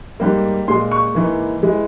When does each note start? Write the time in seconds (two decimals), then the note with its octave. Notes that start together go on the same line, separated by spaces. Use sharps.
0.20 G#2 G3 A#3
0.68 A#2 G#3 C6
0.92 C#6
1.15 G#2 E3 A#3
1.63 E3 G#3